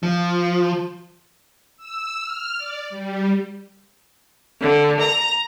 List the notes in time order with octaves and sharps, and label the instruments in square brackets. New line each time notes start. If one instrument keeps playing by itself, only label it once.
[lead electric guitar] F3
[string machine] E6
F6
D5
G3
[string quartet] D3
A#5